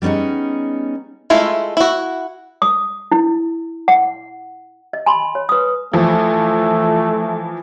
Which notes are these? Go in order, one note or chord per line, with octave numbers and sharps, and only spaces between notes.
G3 B3 C#4 D#4 G#4
G#3 A3 E4 F4
E4 F#4
D#6
E4
F#5
D#5
G#5 B5 C6
C#5
B4 D#6
E3 F3 A3